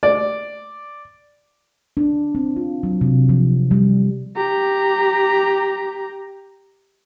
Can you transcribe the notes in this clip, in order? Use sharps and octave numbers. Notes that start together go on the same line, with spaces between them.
D5
D4
C4
F4
F#3
C3
F3
G3
G4 A#5